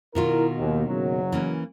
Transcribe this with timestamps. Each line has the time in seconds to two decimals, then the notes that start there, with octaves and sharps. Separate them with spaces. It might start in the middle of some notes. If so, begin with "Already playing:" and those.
0.15 B2 D#3 E4 F4 A#4
0.58 D#2
0.87 F#1 F#3
1.32 E3 A#3 C#4